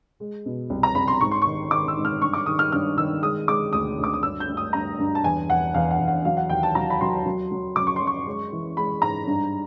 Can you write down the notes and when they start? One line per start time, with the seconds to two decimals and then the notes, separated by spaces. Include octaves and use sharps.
0.20 G#3
0.46 B2
0.70 C2
0.83 A#5
0.95 C2 B5
1.08 C6
1.21 G#2 C#6
1.31 C6
1.42 D#3 C#6
1.71 D#3 D6
1.88 E6
1.97 G#2
2.05 F6
2.21 G2 C#6
2.33 D6
2.46 D#3 D#6
2.59 F6
2.72 G2 F6
2.97 D#3 E6
3.23 G#3 D#6
3.48 G#3 D6
3.73 D2 D#6
3.98 D2
4.04 D6
4.14 D#6
4.23 G2 E6
4.40 G6
4.48 G2
4.57 D#6
4.73 G2 A#5
4.99 G2
5.15 A5
5.23 E2 G#5
5.49 E2 F#5
5.74 E2 F5
5.91 F#5
5.99 E2
6.08 F#5
6.25 F#3 F5
6.37 F#5
6.49 D#2 G5
6.63 A5
6.75 F#3 A#5
6.90 B5
7.01 F#3 C6
7.25 F#3
7.51 F#3
7.76 F#2 D6
7.87 C#6
7.96 C6
8.01 F#2
8.07 C#6
8.27 G#3
8.52 E3
8.77 G#3 B5
9.02 G#2 A#5
9.27 G2